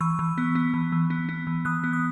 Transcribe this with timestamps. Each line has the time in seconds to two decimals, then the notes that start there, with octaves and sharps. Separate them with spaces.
0.01 E3 C#6 E6
0.19 E3
0.38 B3
0.55 B3
0.74 E3
0.92 E3
1.10 B3
1.29 B3
1.47 E3
1.65 E3 D#6 F#6
1.84 B3
1.93 D#6 F#6